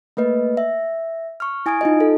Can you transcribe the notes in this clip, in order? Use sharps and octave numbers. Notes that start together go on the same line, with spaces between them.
A3 A#3 B4 D#5
E5
C#6 F6
E4 G#5 D#6 G#6 D7
D#4 F4 D#5
A4